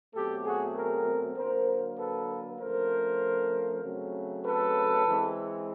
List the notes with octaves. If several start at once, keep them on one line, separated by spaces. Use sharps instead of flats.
B2 F#3 A3 C4 G4 A4
F#4 G#4
G#4 A#4
D3 F#3 A#3 A#4 C5
A4 B4
C#3 F3 A3 C4 A#4 C5
C#3 F#3 A3 C4
A4 B4
E3 G#3 C4